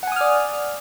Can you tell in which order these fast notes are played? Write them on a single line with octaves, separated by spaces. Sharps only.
F#5 G#5 D#6 F6 D5